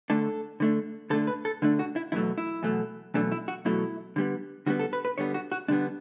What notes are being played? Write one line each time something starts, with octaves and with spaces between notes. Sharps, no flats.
D3 A3 D4 A4
D3 A3 D4
D3 A3 D4 A4
B4
A4
D3 A3 D4
F#4
E4
E2 B2 F#3 A3 E4
E4
E2 B2 F#3 A3
E2 B2 F#3 A3 D4
E4
F#4
E2 B2 F#3 A3 E4
D3 G3 B3
D3 G3 B3 F#4
A4
B4
B4
D3 G3 B3 C#5
F#4
F#4
D3 G3 B3 D4